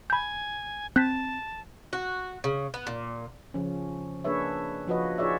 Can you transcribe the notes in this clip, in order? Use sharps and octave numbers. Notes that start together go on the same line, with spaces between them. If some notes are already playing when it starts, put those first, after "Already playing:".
G#5 B5 G6
C4 A5 F#6 G6 B6
F#4
C#3
B3
A#2
C#3 F3 C#4
A#3 D4 G#4 B4 C#5 E5
F3 F4 F#4 B4 C#5 D#5
D#4 F4 G#4 C#5 D5 E5